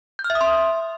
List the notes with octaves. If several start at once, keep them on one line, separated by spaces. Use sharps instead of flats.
G6
F6
E5
D#6
C6